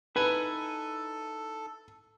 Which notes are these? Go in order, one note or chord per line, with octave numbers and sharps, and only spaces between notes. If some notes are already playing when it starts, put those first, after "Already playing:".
D#4 E4 A4 B4 G#5